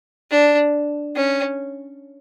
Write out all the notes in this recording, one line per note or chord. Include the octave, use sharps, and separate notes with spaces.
D4
C#4